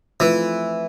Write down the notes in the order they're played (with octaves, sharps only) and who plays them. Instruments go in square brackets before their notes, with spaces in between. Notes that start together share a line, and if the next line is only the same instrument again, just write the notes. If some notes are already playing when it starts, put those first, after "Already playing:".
[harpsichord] E3 [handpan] F3 A3 C4 F4